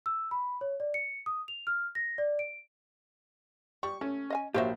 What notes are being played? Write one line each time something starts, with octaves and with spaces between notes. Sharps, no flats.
E6
B5
C#5
D5
C#7
D#6
F7
F6
A#6
D5
D7
G3 C#6
A3 C#4
D#5 F5 G#5
A#1 F#4 G4 C5 C#5 E5 F5